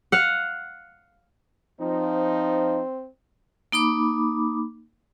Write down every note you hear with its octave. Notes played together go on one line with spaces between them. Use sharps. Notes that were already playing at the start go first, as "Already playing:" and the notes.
F5 F#5
F3 C4 D#4
A#3 D#4 B5 D6